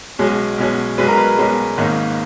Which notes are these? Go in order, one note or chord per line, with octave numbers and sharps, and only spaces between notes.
B1 B2 G#3 C#4
B1 B2 G#3 C#4
B1 B2 G#3 C#4 B4
A#4
B4
B1 B2 G#3 C#4
G#1 G#2 D#3 A#3 C#4